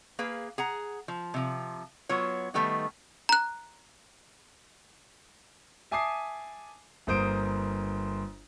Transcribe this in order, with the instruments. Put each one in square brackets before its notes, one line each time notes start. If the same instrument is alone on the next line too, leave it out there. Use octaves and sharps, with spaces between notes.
[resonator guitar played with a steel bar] A#3 G#4 B4 F5
G#4 F#5 A#5
F3
C3 F3
F#3 B3 F4 C#5
D#3 G3 A3 B3 D#4
[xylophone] A#5 F#6
[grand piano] E5 G#5 A5 D6 D#6 C7
G1 A#3 C5 D#6 D7